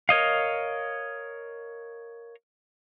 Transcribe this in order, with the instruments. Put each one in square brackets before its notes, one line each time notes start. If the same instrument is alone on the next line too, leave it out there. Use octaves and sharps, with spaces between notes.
[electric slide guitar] A#4 C#5 D#5 F5